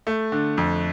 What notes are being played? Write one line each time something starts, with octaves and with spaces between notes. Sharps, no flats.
A3
D3
F2